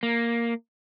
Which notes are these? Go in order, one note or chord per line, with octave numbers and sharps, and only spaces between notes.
A#3